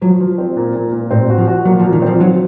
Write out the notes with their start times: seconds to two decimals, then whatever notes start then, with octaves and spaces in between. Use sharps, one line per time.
0.01 F3 F#3
0.21 F3
0.38 C4
0.57 A#2
0.75 A#2
0.92 A#2
1.11 A2 C4
1.30 F#4
1.38 F3
1.48 F#4
1.65 A#2 F#3
1.80 F3
1.84 A#2
1.93 D#3
2.02 F3 C4
2.20 F#3 D#4